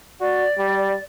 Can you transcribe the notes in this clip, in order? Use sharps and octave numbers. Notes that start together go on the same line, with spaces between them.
F#4 D5
G3